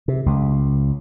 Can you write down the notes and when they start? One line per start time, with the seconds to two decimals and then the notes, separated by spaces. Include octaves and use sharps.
0.08 C3
0.26 C#2